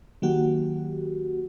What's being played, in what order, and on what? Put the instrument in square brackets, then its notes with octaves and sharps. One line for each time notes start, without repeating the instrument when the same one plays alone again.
[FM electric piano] D#3 F#3 A#3 F#4 G4